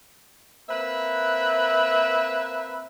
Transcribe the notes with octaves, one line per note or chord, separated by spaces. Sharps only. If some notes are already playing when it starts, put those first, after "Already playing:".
A#3 C4 B4 E5